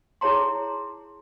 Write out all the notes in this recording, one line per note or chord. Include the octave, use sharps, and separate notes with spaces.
D#4 E4 G#4 C#5 A#5 C6